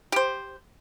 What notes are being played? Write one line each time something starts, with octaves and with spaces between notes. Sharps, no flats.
G4 C5